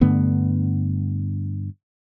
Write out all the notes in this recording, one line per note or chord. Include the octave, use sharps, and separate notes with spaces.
G2 D3 A3 B3